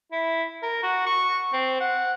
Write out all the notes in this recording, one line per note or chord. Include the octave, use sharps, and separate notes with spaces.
E4
A#4
F#4
C#6
C4
F#5